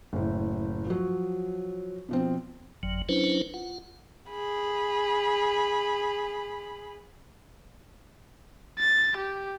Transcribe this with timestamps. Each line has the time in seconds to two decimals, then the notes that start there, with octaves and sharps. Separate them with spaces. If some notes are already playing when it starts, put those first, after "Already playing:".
0.13 F#1 A2
0.87 F3 F#3
2.09 B2 F3 C4
2.83 G1 F2 F#3
3.09 F#3 C#4 D4 E4 B4 C5
3.54 F4 F#5
4.30 G#4 B5
8.79 A6
9.17 G4